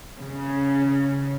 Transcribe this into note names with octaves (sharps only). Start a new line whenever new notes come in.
C#3